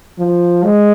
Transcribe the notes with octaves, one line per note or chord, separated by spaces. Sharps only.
F3
G#3